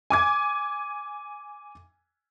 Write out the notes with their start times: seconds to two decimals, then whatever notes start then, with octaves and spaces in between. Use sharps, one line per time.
0.10 G#5 D6 G#6